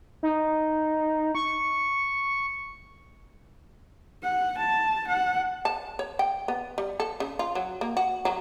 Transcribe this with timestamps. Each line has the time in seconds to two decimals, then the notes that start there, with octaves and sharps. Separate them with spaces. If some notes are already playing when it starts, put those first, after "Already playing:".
0.23 D#4
1.35 C#6
4.23 F#5
4.59 A5
5.08 F#5
5.65 A5
5.99 C#5
6.19 G5
6.48 B3
6.78 G3
7.00 A4
7.20 C#3
7.39 F4
7.55 F#3
7.81 A#3
7.97 F#4
8.25 F#3